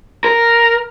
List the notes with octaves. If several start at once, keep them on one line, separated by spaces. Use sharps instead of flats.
A#4